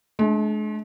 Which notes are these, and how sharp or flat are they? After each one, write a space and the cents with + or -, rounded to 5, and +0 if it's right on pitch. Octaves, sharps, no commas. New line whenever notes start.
G#3 +45 D4 +0